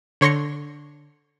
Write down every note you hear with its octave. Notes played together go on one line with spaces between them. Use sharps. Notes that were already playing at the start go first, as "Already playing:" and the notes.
D3 C#5 C6 A#6 C#7